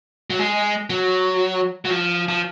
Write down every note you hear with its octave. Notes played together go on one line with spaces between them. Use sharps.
F#3
G#3
F#3
F#3
F3
F3